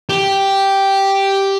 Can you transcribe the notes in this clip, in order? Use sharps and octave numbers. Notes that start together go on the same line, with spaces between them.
G4